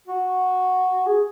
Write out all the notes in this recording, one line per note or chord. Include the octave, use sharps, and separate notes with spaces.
F#4
G#4